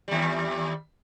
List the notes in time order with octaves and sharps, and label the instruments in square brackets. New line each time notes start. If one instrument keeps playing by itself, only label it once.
[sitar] D#2 G3